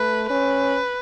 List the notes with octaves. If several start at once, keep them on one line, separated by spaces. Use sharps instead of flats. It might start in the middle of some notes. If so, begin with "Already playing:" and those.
Already playing: A3 B4
C#4 B4